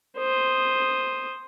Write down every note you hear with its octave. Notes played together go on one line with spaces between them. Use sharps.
C5 D#6